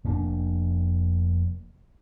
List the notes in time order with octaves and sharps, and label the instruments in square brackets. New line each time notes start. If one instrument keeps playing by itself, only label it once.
[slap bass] F1 A#3 C#4 D4